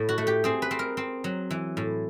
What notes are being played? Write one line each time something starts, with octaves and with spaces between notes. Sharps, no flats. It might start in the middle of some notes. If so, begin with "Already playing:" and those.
Already playing: A2
F#4
A3
G4
C4 G#4
B4
C4
A#4
C4
F#3
E3
A2